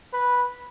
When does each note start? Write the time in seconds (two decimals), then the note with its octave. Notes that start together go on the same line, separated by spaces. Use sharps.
0.13 B4